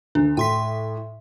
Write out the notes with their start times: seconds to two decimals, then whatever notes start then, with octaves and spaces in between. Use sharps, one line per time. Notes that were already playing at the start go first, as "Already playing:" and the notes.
0.15 D2 D4
0.37 A2 G5 C6 B6